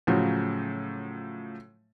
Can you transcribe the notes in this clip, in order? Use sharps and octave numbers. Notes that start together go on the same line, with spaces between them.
A2 C#3 F3 F#3